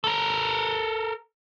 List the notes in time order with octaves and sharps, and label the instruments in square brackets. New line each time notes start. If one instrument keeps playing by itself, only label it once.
[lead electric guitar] A4 A#4